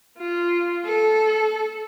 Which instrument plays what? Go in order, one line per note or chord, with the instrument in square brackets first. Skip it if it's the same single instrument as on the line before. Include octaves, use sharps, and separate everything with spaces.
[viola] F4
A4